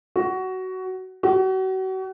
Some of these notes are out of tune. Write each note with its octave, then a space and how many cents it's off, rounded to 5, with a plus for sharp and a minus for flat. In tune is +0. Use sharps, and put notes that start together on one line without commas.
F#4 +15
F#4 +35